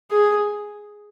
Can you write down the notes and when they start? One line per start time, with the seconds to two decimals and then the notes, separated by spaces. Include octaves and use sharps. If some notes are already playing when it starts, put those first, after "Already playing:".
0.11 G#4